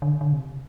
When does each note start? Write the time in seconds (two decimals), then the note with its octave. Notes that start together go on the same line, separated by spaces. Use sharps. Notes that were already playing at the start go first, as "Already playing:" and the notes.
0.02 D3
0.21 D3
0.33 C3